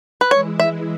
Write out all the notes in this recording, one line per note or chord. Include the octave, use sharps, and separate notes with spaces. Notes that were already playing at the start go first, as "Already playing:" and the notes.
B4
E3 G#3 E4 C#5
E5